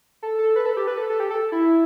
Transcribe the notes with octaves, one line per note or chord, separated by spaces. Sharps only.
A4
A4
B4
A4
G4
B4
A4
A4
G4
A4
E4